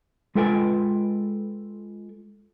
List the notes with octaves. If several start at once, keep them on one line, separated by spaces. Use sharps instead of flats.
G#3 F4 A4 B4 G5 G#5